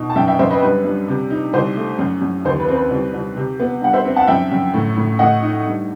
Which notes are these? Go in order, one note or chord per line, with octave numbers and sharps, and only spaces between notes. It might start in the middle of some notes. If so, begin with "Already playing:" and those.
Already playing: B2 D#4
A5
F#2 E5 G5
E5 G5
F#2 C5 E5
B4 D#5
G2 B4
G2
C3
D#4
C2 C5
A3
F#2
F#2
D#2 C5
B4
C4
B4
C2
C2
C3
B3
G2 F#5
C5 E5
C4
F#5 A5
F#2 E5 G5
F#2
A2
A2
A2 D#5 F#5
D#4
G2